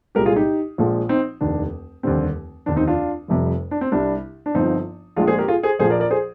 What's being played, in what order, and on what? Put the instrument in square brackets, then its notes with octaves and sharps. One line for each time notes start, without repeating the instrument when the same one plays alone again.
[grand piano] C2 A#2 G#3 G4 A#4
F4 G#4
D#4 G4
A#1 A#2 F3 G#3
C4 D#4
F1 D#2 D#3 D4
F1 D#2 D3 G3 C4
F1 D#2 D3 D4
C4 D#4
D4 F4
F1 F2 C3 G3
D4
C4
C2 C3 G3 D4
D4
G1 G2 F3 C4 D#4
A#1 A#2 G#3 D4 F4
G#4 C5
G4 A#4
F4 G#4
G#4 C5
A#1 A#2 F3 G#4 C5
A#4 D5
A#4 D5
G#4 C5